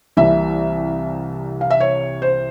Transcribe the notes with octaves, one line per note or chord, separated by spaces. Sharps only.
C2 C3 E3 G3 A#3 E5
F5
E5
C#5
C5